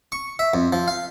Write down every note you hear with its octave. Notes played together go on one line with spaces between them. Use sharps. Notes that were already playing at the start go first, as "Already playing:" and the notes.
C#6
E5
F2
F3
F5